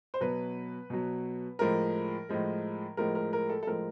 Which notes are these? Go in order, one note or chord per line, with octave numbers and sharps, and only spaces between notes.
C5
B2 F#3 B4
B2 F#3
A2 F3 G#3 A#4
A2 F3 G#3
A2 F3 G#3 A#4
A#4
A#4
A4
A4
A2 F3 G#3 A#4